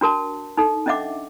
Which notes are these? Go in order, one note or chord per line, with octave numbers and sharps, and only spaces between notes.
D4 F#4 A#4 A5
D#4 A4
C#4 D4 D#5 E5 F#5 D6